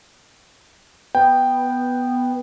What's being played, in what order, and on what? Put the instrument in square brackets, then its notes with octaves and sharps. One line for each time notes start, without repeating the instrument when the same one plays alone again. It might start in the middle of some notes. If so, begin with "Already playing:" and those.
[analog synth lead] B3 [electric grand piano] G5